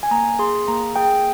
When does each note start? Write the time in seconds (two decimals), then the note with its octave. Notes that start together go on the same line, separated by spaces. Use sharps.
0.03 G#5
0.11 A#3 A#5
0.39 G#4 C6
0.68 A#3 A#5
0.96 G#4 G5